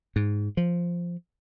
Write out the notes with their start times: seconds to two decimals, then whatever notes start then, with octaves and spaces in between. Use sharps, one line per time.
0.16 G#2
0.57 F3